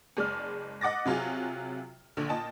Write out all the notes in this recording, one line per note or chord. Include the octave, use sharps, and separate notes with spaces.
F#1 G#3 D5 F6
D#5 F#5 D6 A6 A#6
C3 F#3 F4 F#4 G#4
A#1 D3
A#2 D#5 G5 A5